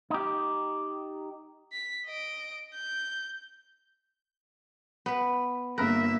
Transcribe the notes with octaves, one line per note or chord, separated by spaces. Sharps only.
D#4 G4
B6
D#5 D7
G6
B3 B4
G1 A#3 A#4 E5 B5 F#6